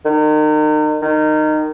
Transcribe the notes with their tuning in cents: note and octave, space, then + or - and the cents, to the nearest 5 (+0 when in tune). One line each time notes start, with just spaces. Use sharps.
D#3 -35
D#3 -20